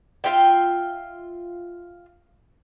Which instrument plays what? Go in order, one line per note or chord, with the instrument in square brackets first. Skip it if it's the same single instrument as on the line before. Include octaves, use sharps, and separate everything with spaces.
[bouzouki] F4 E5 G5